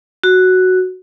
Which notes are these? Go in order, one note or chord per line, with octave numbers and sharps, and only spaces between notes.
F#4